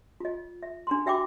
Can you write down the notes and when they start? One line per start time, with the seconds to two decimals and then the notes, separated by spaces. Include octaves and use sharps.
0.20 F4 D#5
0.63 E5
0.87 D4 A#5 C6
1.06 F#4 E5 G5 B5 D6